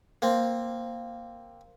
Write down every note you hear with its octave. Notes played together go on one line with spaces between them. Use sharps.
A#3 C4